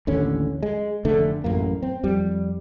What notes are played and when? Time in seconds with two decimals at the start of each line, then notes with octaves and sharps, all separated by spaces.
0.07 A1 D#2 D3 C#4
0.63 G#3
1.05 F1 D3 A3
1.44 A1 F#2 A#3
1.82 C4
2.03 F2 G3